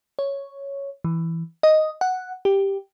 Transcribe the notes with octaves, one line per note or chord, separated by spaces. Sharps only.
C#5
E3
D#5
F#5
G4